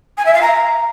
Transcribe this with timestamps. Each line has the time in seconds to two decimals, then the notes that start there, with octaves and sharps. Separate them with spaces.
0.17 G#5
0.25 E5
0.33 F5
0.41 A#5